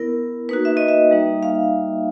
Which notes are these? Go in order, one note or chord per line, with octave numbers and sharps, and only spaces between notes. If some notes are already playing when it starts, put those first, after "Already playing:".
Already playing: B3 E4 A#4
A#3 D#4 F#4 B4
E5
D#5
E5
G3 A#3 D#4
F5